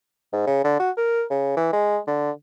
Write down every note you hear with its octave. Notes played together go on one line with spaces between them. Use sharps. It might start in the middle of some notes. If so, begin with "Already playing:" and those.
G#2
C#3
D3
F#4
A#4
C#3
E3
G#3
D3